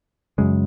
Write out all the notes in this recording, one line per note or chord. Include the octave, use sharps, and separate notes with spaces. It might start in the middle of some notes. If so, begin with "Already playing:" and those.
F#2 C#3 G#3